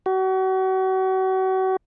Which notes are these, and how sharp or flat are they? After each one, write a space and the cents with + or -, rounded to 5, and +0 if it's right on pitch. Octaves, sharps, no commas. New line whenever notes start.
F#4 +35